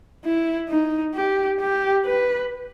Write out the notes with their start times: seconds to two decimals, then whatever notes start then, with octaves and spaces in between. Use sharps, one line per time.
0.25 E4
0.69 D#4
1.15 G4
1.60 G4
2.05 B4